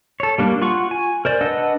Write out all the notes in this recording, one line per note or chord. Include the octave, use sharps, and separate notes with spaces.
A4 C#5
G3 A#3 D4
F4 F#5 C#6
G#5
A#4 C5 D5
D4 B4 D#5 F#5 E6